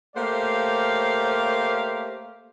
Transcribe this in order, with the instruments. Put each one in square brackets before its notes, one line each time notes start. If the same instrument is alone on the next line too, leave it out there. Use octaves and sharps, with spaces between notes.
[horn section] A3 A#3 G4 C5 C#5 F5